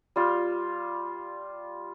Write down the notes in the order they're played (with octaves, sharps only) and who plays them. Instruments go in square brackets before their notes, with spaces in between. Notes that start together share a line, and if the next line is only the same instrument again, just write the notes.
[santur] G3 F4